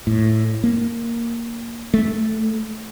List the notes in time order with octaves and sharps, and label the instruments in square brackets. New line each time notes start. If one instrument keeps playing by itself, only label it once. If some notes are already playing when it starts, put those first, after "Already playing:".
[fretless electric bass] A2
A#3
A3